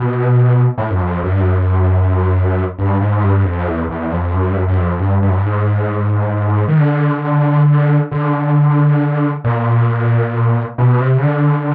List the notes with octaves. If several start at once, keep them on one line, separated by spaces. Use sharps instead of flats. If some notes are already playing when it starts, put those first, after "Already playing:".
Already playing: B2
A2
F#2
F2
F#2
G2
F#2
G2
G#2
G2
F2
E2
E2
F2
F#2
G2
F#2
F#2
F2
G2
G2
F#2
G2
G#2
D#3
D3
D3
A#2
B2
C3
C#3
D3